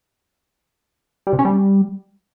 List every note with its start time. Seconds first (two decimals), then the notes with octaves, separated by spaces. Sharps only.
1.27 G3
1.33 C3
1.39 C#4
1.45 G3